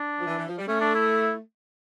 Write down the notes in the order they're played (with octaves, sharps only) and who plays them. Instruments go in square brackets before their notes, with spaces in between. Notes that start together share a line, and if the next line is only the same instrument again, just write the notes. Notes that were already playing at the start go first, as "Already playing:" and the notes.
Already playing: [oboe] D4
[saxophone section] F3
E3
E3
F3
G3
[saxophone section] A3 [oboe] C#4
[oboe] D4
E4